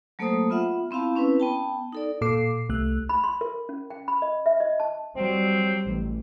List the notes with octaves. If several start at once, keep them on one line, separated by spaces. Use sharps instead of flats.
F#3 A3 A#3 A4 C5 D#6
B3 F4 E5 F#5
B3 C4 E4 F5 A5
C4 C#4 E4 B4
B3 G5 A5
D#4 A4 D5
A#2 A4 D6 C7
C2 A3 F#6
B5
C6
A#4
C#4
G5
B5
D#5
E5
D#5
A5
F#3 G3 C4
A1